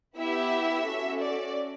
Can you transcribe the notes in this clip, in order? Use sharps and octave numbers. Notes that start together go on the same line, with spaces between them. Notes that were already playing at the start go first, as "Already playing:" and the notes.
B3 E4 G4 E5
C#4 F#4 A4
D5